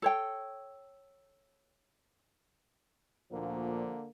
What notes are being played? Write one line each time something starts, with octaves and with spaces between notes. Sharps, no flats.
A4 C#5 G5
D2 A#2 D3 F3 A#3